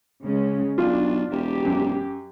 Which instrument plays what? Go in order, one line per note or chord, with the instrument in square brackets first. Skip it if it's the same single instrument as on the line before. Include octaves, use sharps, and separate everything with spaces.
[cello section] C#3 G#3 C#4
[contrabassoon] B1 [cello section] D4 [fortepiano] F4
[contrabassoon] E1 [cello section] G4
[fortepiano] F#2